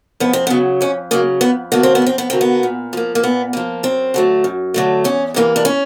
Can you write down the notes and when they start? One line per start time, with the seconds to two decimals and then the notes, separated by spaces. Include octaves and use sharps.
0.20 F2 B3
0.33 C4
0.47 C#3 F#3 B3
0.81 F2 C#4
1.11 C#3 F#3 A#3
1.41 F2 B3
1.72 D3 F#3 A#3 B3
1.83 C4
1.95 B3
2.02 F2 C4
2.18 B3
2.30 D3 F#3 A#3 C4
2.41 B3
2.63 A#2
2.93 F3 A#3
3.15 A#3
3.23 A#2 B3
3.53 F3 A#3
3.83 F#2 C4
4.14 D3 F#3 A3
4.44 F#2
4.74 D3 F#3 A3
5.04 E2 C#4
5.34 C3 E3 G3 A#3
5.56 D4
5.65 C#4